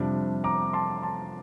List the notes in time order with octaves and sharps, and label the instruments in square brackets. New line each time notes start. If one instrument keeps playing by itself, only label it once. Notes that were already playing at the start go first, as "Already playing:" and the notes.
Already playing: [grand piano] F2 C3 G3 D4
A#5 D6
A5 C6
A5 C6